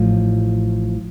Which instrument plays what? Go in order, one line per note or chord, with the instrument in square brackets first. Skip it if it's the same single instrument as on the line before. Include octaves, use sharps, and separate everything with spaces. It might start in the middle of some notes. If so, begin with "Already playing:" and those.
Already playing: [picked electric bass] A1 A2 F3